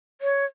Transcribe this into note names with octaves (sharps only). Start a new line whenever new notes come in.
C#5